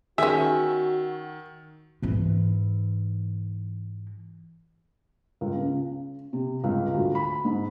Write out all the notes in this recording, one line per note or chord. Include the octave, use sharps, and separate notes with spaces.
D#3 C#4 F#4 G#4 E5
G#2 E3
C#2
C#3
C3
C#2
D2
B5
G#2